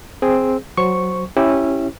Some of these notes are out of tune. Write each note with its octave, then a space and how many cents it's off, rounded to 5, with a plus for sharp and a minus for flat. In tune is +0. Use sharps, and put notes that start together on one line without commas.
C4 +0 G#4 +0
F#3 +0 C5 +0 C#6 +0
C#4 -15 E4 +0 G4 +0